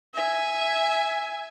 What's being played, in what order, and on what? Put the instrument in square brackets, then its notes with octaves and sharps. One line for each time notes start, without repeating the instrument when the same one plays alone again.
[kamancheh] E5 G#5